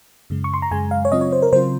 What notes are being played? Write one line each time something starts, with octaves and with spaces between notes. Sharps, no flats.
F#2 C#3 G#3
C#6
C6
A#5
F#2 C#3 G#3 G#5
F5
C#5
C#3 F#3 C4 F4 D#5
C#5
C5
A#4
C#3 F#3 C4 F4 C5